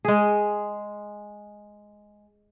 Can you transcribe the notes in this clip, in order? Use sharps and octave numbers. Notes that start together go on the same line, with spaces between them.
G#3 G#4